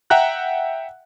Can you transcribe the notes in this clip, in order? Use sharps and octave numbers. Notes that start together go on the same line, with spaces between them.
E5 F#5 G5 A#5 F#6